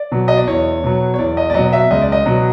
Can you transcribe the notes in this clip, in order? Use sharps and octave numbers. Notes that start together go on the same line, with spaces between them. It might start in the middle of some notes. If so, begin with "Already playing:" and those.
Already playing: D5
B2 F#3
D#5
D5
E2 C#5
B2 F#3
C#5
E2 D5
D#5
D5
B2 F#3 D#5
E5
C#2 D#5
D5
D#5
B2 F#3